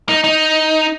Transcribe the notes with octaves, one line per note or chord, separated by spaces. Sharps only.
D#4
D#4